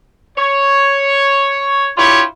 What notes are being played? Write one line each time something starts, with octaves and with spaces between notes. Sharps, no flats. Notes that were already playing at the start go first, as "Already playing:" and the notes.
C#5
D4 E4 F4 G4 C#5